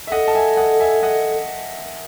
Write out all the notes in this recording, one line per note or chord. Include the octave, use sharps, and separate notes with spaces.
E5
A4 D#5 F#5
A5
E5 G#5
D#5 F#5
E5 G#5
D#5 F#5